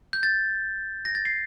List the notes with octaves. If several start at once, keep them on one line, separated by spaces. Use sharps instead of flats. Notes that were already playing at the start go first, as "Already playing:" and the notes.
G6
A6
A#6
A6
C7